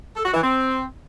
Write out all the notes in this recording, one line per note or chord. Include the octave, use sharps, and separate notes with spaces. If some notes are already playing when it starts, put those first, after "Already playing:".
A4
F#4
E3
C4